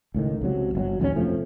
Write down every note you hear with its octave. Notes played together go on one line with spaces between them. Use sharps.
C#2 A2 D#3
C#2 C3 F#3
G1 B2 F#3
A#1 D#2 D#3 C#4
F2 C3 F3 A3